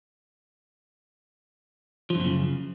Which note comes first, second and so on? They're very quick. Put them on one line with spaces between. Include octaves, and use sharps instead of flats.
F3 F#2 A#2 C#3